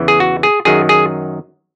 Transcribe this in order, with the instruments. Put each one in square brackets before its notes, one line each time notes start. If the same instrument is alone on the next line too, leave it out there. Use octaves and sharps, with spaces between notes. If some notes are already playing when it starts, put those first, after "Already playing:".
Already playing: [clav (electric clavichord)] E2 C#3 E3
G#4
F#4
G#4
F#2 D#3 F#3 G#4
G#4